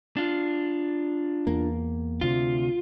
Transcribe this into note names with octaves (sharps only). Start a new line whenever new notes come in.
D4 F4
E2 A#3
D2 C3 F4